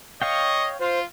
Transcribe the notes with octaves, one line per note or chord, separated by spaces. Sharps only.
C#5 D#5 F5 G5 C#6
F4 C5